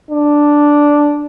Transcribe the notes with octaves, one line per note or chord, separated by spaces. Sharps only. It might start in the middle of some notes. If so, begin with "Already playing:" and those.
D4